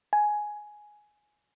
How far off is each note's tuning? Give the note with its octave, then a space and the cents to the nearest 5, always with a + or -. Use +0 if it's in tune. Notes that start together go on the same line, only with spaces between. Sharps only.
G#5 +10